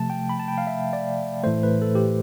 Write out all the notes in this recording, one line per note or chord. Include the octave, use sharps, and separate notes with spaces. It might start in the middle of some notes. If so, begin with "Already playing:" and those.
Already playing: C3 F3 A3 A5
G5
B5
A5
G5
F5
E5
D5
A2 E3 A3 C5
B4
A4
G4